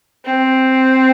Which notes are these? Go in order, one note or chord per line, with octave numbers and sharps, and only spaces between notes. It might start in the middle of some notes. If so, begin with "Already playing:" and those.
C4